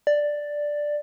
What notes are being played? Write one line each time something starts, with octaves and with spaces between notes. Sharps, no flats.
D5